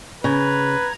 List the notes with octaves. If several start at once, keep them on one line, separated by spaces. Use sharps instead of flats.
C#3 B4 A#5 G#6